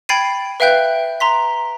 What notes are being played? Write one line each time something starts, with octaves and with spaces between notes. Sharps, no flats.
G5 B5 G#6 A6 C7 D#7
B4 E5 F5 G5 F#6 G6
A#5 C6 B6